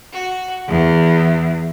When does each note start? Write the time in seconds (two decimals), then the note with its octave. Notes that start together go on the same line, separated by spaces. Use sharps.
0.13 F#4
0.68 E2